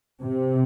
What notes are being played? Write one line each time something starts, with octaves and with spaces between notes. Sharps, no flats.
C3